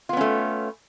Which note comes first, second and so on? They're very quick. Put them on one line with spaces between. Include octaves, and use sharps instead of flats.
F4 B3 C#4 A3